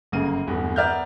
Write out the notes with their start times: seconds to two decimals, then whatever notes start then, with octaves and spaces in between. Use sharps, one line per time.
0.12 G1 F#2 C#3 A#3 D#7
0.47 D1 E2 G2
0.76 B3 A#4 D5 E5 F6 G6